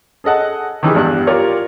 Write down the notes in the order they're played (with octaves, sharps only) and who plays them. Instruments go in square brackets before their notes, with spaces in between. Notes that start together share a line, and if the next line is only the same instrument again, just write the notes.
[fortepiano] G#4 A4 D#5 F#5 A5
D#3 E3 G4 G#4
E2 G2 G3 G4 F#6
F4 G4 A#4 C#5 D5